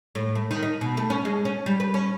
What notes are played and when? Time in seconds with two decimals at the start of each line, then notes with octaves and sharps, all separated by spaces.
0.15 A2
0.35 A3
0.51 D#3
0.63 D#4
0.81 B2
0.97 A3
1.10 C#4
1.25 G#3
1.45 C#4
1.66 G3
1.80 B4
1.94 C#4